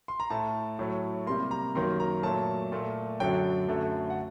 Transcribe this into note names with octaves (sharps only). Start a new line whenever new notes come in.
C6
A#5
A2 A3 A5
A2 F#3 A3
C3 G3 A#3 C6
A#5
F#2 D#3 F#3 A#3 C6
A#5
A#2 F#3 A3 A5
A#2 A3
F#2 D3 F#3 G5
F#2 D3 A3
F#5